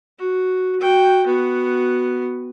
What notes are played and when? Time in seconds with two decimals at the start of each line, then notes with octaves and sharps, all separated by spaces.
0.19 F#4
0.80 F#4 G5
1.26 B3 F#4